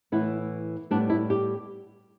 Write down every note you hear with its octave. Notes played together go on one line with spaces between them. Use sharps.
A2 E3 B3 E4
A2 G3 B3 D4
E4
G4